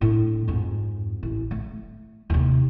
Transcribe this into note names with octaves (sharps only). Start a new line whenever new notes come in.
A2 D4
F2 G#2
A1
A3
D#2 C3